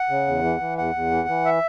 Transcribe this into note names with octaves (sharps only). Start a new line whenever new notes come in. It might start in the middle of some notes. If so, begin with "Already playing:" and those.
Already playing: F#5
C#3
E2
E3
E3
E2 F#5
E2
E3
E3
E5